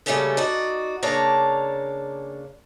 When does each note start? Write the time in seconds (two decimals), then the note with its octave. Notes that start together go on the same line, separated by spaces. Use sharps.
0.06 C#3 G3 A3 A#3 C#4 A4
0.37 D#4 F#4 D5
1.03 C#3 A#3 D4 C#5 A5 A#5